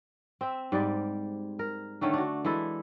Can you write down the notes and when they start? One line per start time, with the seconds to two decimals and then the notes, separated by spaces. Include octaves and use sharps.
0.41 C4 E5
0.72 G#2 G3 G#3 D5
1.59 A#4
2.01 D3 D#3 A3 C#4
2.14 D4 F#4
2.45 E3 G#3 E4 A4